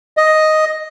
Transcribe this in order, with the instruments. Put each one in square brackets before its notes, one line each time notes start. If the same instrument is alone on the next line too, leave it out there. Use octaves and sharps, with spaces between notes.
[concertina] D#5